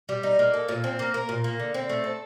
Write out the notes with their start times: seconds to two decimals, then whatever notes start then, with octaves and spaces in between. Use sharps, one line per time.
0.09 G3
0.23 D#4
0.39 A#3
0.54 A4
0.69 A#2
0.84 C4
0.99 A#3
1.14 A#4
1.29 A#2
1.44 A#3
1.59 D3
1.74 C4
1.89 A3
2.04 A4